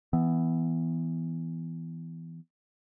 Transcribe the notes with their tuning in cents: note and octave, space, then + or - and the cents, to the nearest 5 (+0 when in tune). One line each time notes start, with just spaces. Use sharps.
E3 +0 B3 +5